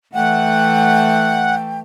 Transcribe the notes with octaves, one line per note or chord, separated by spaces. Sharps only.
E3 A3 F#5 G5